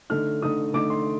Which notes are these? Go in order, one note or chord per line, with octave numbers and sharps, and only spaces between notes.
D3 A3 D#4 F6
D3 A3 D#4 D#6
D3 A3 D#4 D6
C6